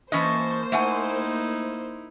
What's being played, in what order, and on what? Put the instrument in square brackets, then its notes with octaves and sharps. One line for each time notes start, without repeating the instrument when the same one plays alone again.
[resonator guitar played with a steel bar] E3 C#4 D#5 [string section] A#3 C5 [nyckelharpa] A5 C#6
[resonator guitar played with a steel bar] A3 F#5 G#5 [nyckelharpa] D#4 E4